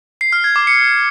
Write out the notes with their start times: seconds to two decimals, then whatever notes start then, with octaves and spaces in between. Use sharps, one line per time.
0.21 C7
0.33 F6
0.44 G#6
0.56 D6
0.67 C#7